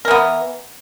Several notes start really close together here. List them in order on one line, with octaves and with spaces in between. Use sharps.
A#4 E3 B3